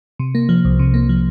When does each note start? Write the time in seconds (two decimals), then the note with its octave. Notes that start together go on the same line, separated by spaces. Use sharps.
0.19 C3
0.35 A#3
0.49 F3
0.65 C2
0.79 C3
0.94 A#3
1.09 F3